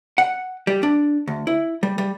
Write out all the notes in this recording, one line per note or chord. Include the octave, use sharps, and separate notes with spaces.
F#5
G3
D4
D2
E4
G3
G3